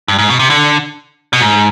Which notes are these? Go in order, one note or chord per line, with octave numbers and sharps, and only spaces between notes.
G2
G#2
B2
C3
D3
B2
G#2